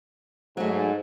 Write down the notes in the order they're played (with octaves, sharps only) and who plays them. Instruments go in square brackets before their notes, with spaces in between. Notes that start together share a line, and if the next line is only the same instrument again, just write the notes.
[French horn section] G#2 [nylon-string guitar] F#3 A3